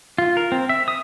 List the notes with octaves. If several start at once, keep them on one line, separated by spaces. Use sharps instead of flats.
F4
A#4
C4
E5
D#6